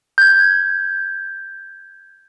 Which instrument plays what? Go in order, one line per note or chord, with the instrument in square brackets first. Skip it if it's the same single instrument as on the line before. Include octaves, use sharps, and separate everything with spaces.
[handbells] G6 G#6